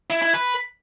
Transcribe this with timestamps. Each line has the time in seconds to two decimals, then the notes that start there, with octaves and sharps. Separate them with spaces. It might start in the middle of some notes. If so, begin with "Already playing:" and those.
0.10 E4
0.22 E4
0.34 B4